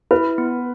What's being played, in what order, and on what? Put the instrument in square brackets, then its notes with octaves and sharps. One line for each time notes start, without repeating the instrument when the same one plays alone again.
[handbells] E4 [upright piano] B4
[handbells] B3